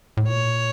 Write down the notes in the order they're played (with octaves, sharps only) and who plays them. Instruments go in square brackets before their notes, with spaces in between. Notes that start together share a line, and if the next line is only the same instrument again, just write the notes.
[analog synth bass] A2
[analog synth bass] A#2 [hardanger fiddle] C#5